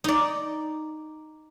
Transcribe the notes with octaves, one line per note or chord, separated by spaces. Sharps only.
D#4 D5